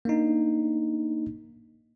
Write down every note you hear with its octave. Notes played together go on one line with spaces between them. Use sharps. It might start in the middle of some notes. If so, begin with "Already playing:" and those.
A#3 D4 D#4